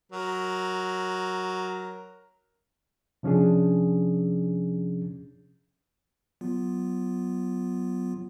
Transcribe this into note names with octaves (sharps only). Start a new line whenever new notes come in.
F#3 A#4
C3 F3 C#4 D4 G#4
F#3 B3 F4